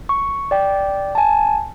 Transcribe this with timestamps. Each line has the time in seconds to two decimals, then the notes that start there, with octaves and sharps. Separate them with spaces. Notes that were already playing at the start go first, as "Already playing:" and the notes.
0.09 C#6
0.51 D5 G5
1.15 G#5 A5